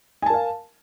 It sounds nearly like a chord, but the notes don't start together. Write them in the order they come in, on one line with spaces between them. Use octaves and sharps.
G#5 A5 A#4 F5